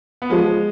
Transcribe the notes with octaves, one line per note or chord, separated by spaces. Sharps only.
B3
F3 G#3